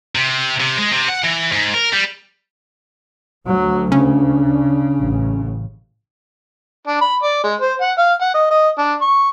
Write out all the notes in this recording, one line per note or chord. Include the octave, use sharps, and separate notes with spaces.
C3
C3
G#3
C3
F#5
E3
G#2
A#4
G3
D2 F#3
C#3 C#4 D4
A1
D4
B5
D5
G#3
C5
F#5
F5
F#5
D#5
D#5
D4
C#6